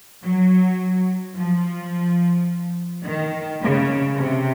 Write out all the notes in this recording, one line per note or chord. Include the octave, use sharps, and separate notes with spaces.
F#3
F3
D#3
C#3
C3